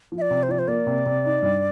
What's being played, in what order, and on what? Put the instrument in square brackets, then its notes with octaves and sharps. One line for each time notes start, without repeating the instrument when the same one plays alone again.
[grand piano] F3
[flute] E5
D5
[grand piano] C3
[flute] C5
[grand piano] F3 [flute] D5
[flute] C5
[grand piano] A#3 [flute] D5
[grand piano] C3
C3
D#4
G2